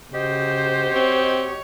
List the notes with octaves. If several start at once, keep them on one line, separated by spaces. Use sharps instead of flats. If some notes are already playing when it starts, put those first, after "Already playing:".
C#3 F#4 G4 C5 D#5
C4 C#5